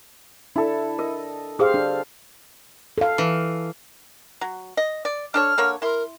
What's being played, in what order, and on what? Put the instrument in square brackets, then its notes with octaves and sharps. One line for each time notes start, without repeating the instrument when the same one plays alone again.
[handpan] D4 [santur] E4 A4
[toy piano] A#4 [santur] D#5
[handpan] G4 C5 F5 [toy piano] G#4 D#6
[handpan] D4
A4 F5
[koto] E3
[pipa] F#3
D#5
D5
[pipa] D4 A4 C#5 [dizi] F6
[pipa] D3 A#3 C#5
[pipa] E4 C6 [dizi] A#4